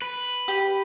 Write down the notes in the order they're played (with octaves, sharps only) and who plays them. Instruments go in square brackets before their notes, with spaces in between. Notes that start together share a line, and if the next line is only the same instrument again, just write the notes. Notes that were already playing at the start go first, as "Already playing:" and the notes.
[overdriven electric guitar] B4
[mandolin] G4